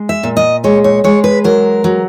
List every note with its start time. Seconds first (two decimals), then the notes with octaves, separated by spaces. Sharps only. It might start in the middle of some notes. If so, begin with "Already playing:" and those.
Already playing: G#3
0.09 E5
0.23 A#2
0.37 D#5
0.64 G#3 C#5
0.84 C#5
1.04 G#3 C#5
1.24 B4
1.44 F#3 A#4
1.84 F#3